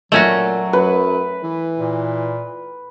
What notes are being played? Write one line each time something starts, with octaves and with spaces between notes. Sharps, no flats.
A#2 F#3 A3 C#4 F#4
F#2 B4
E3
A#2